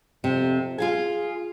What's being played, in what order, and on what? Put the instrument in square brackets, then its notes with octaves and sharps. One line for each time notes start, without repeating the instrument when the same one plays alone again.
[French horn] F2 [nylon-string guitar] C3
[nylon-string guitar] F4 F5 G#5 [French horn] G#4